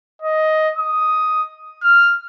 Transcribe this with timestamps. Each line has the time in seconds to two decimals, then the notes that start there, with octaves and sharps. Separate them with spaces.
0.22 D#5
0.78 D#6
1.83 F6